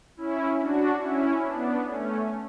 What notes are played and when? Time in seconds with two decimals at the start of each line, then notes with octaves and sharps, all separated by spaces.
0.17 C#4 E4
0.60 D4 F#4
1.02 C#4 E4
1.44 B3 D4
1.87 A3 C#4